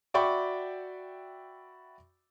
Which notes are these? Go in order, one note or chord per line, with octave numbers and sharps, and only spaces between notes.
F#4 D5 E5 G5 B5 C#6